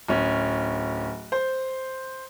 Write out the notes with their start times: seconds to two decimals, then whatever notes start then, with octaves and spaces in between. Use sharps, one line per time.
0.08 D1 C#4
1.32 C5